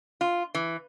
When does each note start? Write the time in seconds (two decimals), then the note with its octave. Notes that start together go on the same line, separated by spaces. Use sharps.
0.21 F4
0.55 E3